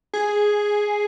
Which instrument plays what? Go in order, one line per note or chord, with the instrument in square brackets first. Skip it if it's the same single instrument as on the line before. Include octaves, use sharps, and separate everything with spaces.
[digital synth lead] G#4